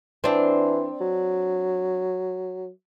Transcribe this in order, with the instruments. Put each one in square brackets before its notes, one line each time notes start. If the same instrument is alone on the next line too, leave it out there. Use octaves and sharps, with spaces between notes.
[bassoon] E3 [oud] C4 D4
[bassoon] F#3